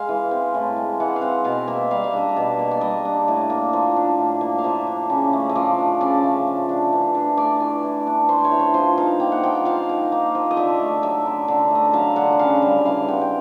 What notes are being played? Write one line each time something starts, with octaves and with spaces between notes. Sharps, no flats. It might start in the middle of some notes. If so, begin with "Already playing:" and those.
Already playing: G#3 F5
E3
C4
A2
G#3
E3 F#5
F5
C4 F#5
B2 F5
A#3 E5
G3 F5
E5
D4 D#5
E5
B2
A#3
D5
G3 D#5
D4
A2
A#3
F3
D4
A2
A#3
F5
F3 E5
D4
C#3
A3
D#5
F3 D5
D4
C#3 D5
A3
F3
D4
E3
D4
A3 D5
E3
E3
D4
A3 C5
C#5
E3
C5
F3 C5
D#4 F5
A#3 G5
F#5
F3 G5
F#5
F3 F5
D#4
A#3
F3
D#5
D3 E5
A3
F#3 E5
D3
D3
A3 D#5
E5
F#3 F5
D3 F#5
F#5
C#3 F5
G3 E5
E3 F5
C4 F#5
G5